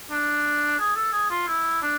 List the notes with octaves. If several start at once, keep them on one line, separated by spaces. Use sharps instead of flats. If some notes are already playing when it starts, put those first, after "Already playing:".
D4
G#4
A4
G#4
F4
E4
D4